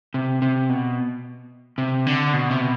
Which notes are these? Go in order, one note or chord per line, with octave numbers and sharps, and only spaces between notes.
C3
C3
B2
C3
D3
B2
C3
B2